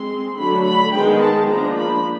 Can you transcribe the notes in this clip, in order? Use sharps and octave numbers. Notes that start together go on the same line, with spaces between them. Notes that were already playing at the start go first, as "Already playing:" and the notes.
Already playing: G#3 C4 C6
D3 F#3 A3 D4 B5
B5
D#3 G#3 B3 G5
A5
F3 A#3 D4 A#5
B5